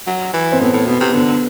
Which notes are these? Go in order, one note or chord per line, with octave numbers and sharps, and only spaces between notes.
F#3
E3
C4
A2 B3
A2
B2 B3
C3
D3 B3